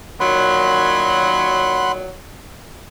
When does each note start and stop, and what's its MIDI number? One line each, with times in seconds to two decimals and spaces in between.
0.20 2.10 46
0.20 2.10 51
0.20 2.10 54
0.20 1.92 78
0.20 1.92 83
0.20 1.92 84